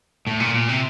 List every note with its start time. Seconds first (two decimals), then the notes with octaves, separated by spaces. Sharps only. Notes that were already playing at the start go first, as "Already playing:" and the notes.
0.27 A2
0.40 A#2
0.54 A#2
0.69 C3